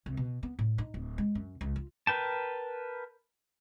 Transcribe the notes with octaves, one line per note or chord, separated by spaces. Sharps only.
C2
B2
B3
A2
D#4
D1
G#3
F#2
C#2
F4
A#4 B4 G5 A5